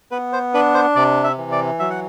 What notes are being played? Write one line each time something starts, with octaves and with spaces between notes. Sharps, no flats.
B3 B4
C5
D4 B4
C5
C3 D5
E5
E3
D5
F#3 E5
F#5